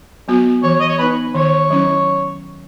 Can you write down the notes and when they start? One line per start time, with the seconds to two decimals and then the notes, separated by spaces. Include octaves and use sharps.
0.28 F#3 B3 F#4
0.63 E3 C#5
0.79 D#5
0.88 C#5
0.98 B3 D#4 B4
1.34 D#3 C#5
1.70 F#3 C#4 E4